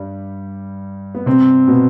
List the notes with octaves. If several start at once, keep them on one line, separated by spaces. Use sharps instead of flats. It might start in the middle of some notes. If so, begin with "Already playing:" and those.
Already playing: G2 G3
B3
C3 C4
B2 B3